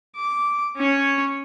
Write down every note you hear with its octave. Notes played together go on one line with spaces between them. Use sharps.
D6
C#4 C#5